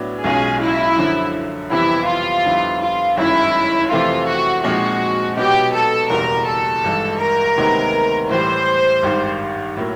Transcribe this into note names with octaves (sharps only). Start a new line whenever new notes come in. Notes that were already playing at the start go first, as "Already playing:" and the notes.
Already playing: A2 F#3 B3 D4
B1 B2 G#3 C#4 F4 G#4
E4
F#2 D3 F3
F2 C3 E3 G3 B3 E4
F4
F2 D3 G3 B3 E4
F4
G1 F#2 D#3 G#3 C#4 E4
F2 C3 E3 A3 C4 F4
F#4
A#2 F3 G#3 C4 D#4 F#4
B2 F#3 B3 D#4 F#4 G4
A4
F#1 E2 B2 G3 A#4
A4
G#1 G2 E3 G#3
A#4
D2 C3 D#3 G#3 B3
A2 E3 G3 C5
G#1 G2 D#3 G3
A2 F#3 A#3